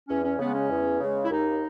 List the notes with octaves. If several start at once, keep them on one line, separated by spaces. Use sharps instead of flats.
E2 C#4
C#4
C#3 G#3 B3
C#4
E2
C#3 G#3
E4
D#2 D#4